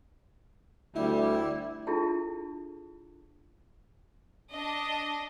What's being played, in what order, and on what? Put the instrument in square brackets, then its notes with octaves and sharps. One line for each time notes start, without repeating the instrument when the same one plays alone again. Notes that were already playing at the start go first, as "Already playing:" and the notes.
[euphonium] D2 [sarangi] G3 [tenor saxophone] E4
[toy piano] D4 E4 F4 G#4 A4 A5
[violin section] D4 D#5